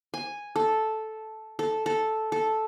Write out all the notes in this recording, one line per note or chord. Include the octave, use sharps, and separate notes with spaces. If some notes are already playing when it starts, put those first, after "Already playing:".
G#5
A4
A4
A4
A4